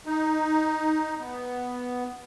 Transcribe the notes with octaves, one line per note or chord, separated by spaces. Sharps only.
D#4
B3